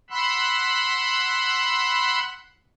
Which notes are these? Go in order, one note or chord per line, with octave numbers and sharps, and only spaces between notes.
F#5 B5 C6 E6 F#6